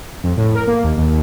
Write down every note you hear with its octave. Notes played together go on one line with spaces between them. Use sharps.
F2
A2
A#4
A#3
D#2
D#2